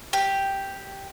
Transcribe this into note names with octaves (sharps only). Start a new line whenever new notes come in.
G4